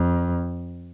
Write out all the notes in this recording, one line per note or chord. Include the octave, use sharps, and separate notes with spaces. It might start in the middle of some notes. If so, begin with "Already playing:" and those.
Already playing: F2